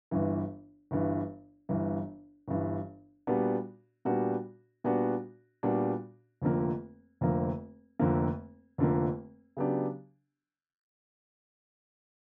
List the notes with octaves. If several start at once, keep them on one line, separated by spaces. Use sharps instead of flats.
G1 G2 E3
G1 G2 E3
G1 G2 E3
G1 G2 E3
A#2 G3 B3 D4 F#4
A#2 G3 B3 D4 F#4
A#2 G3 B3 D4 F#4
A#2 G3 B3 D4 F#4
F1 F2 D3 F3 A#3
F1 F2 D3 F3 A#3
F1 F2 D3 F3 A#3
F1 F2 D3 F3 A#3
C#3 F#3 B3 D4 G4